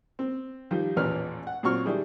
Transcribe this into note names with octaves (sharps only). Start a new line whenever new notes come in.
C4
D#3 F3 G3
A1 E2 A#2 C#4 B4 F6
F#5
A#2 F#3 C4 C#6 F6
D#3 G3 D4 E4 G#4